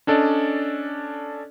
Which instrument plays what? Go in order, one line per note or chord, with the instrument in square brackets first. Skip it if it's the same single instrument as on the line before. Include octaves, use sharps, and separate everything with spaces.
[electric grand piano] C#4 D4 A4 D5 D#5